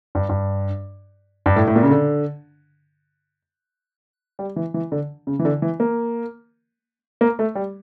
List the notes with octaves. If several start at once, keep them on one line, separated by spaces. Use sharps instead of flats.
G2
G2
G2
A2
A2
A#2
C#3
D3
G3
E3
E3
D3
C#3
E3
D3
E3
A#3
A#3
A3
G3